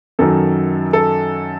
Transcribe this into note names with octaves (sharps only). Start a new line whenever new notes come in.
F#2 D#3 F#3 A4
A4